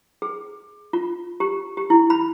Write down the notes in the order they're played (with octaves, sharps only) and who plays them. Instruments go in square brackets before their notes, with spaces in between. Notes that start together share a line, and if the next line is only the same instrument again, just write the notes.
[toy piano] G#4
F4
G4
G4
E4
B5